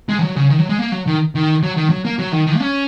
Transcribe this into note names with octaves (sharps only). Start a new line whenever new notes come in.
G#3
D#3
F#3
C#3
D#3
F#3
G#3
A#3
F#3
D#3
D#3
F#3
D#3
F#3
A#3
F#3
D#3
D#3
A#3
C#4